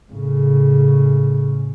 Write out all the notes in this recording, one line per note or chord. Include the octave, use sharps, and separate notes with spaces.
A2 C#3